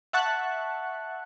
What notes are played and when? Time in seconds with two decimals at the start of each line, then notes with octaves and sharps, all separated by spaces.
0.13 E5 F#5 A5 C#6 F#6